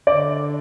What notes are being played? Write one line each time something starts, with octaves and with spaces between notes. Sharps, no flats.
D3 D5